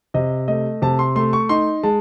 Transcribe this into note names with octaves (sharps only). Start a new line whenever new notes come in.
C3 D#5
A3 D#5
C3 A5
C6
A3 C6
C#6
D#4 C6
G#3 A5